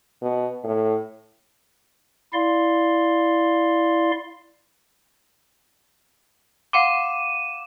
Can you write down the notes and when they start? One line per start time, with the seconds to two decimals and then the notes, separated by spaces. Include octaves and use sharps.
0.22 B2
0.64 A2
2.33 E4 D5 F5 C6
6.73 F5 F#5 C6 D6 D#7 E7